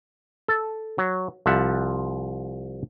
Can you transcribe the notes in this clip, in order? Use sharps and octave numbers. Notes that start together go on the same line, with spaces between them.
A4
F#3
C2 F3 E5 F#5